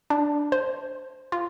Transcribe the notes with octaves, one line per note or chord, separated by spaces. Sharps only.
D4
C5
F4